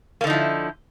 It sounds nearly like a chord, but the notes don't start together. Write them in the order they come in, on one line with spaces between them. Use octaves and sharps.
A#3 D3 D#4 F3 E4